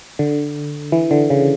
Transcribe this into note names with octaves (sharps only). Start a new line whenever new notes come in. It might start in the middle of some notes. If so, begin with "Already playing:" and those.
D3
E3
D3
C#3